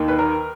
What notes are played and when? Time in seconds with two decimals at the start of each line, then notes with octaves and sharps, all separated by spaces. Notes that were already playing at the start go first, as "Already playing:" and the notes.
Already playing: D#2 D#3 A#3 D#4
0.08 B4
0.18 A#4